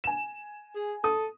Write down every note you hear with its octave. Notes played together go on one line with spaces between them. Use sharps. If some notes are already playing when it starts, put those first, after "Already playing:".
G#5 E7
G#4
A4 D#6